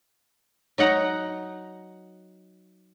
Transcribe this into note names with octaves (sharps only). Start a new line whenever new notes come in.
F#3 D#4 F#5 A#5